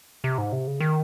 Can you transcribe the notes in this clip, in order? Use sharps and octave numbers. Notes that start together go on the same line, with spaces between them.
C3
G#2
C3
C#3
D#3